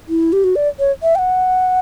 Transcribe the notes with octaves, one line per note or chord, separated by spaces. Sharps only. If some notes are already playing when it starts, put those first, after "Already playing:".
E4
G4
F#4
D5
C#5
E5
G5
F#5